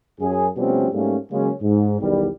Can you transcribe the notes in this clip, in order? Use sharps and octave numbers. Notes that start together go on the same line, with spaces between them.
F#2 G#4
B2 F3 G3 A3 C4 C#4
G#2 G3 A3 A#3 C#4
C#3 F#3 G#3 A#3 C#4
G#2
B1 E2 D#3 G3